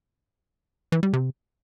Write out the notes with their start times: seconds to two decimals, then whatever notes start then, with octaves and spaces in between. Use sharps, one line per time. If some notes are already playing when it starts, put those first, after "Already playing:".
0.92 E3
1.03 G3
1.13 C3